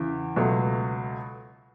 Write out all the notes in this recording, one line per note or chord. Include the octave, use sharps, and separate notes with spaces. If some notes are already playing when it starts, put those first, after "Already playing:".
Already playing: E2 C#3 E3
C#2 B2 F#3 A3